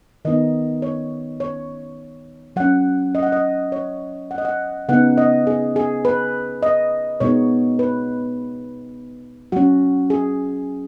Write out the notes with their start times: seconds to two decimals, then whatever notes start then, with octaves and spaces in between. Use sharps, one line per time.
0.25 D#3 B3 D#4 D#5
0.82 C#5
1.40 C#5
2.56 F#3 C#4 F#5
3.15 D#5
3.23 F#5
3.32 D#5
3.72 C#5
4.31 F#5
4.38 D#5
4.45 F#5
4.88 C#3 B3 D#4 F#5
5.18 D#5
5.47 G#4
5.76 G#4
6.05 B4
6.63 D#5
7.20 B2 G#3 B3 D#4 C#5
7.79 B4
9.52 F#3 C#4 F#4
10.10 G#4